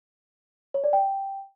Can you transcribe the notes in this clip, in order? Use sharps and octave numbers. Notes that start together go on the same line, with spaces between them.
C#5
D5
G5